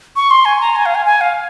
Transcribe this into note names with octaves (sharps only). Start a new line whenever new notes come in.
C#6
C6
G#5
A#5
G#5
F5
G#5
G#5
F5